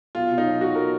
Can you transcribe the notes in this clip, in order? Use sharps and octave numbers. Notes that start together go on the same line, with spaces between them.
B1 F4
B2
D#4
F#3
B1 F#4
A#4